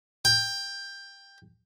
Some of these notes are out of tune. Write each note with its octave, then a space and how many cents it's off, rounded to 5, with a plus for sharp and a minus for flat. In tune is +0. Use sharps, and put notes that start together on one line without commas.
G5 +15